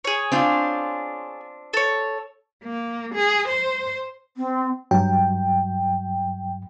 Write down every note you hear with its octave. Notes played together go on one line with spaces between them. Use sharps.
G#4 C#5
C4 D4 F4
A4 C#5
A#3
G#4
C5
C4
G2 F#3 G5